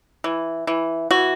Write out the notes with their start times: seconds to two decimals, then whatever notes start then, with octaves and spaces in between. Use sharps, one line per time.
0.24 E3
0.67 E3
1.11 E3 F#4